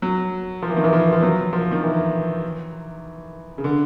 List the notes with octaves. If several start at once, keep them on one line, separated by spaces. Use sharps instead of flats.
F#3
F3
E3
D#3
E3
F3
F3
F#3
F3
D#3
E3
C#3
D3